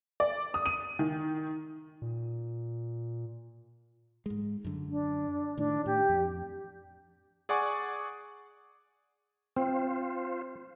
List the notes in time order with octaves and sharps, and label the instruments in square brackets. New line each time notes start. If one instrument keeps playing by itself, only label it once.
[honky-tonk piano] D5
D#6
D#7
D#3
[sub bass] A#2
[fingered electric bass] G#2 G#3
F#2 D3
[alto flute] D4
[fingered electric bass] A2 D#3 [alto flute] D4
[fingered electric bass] A2 [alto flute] G4
[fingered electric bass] F2
[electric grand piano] G#4 D5 F#5 G#5 C#6 D6
[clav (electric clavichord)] C4 [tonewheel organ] F4 C5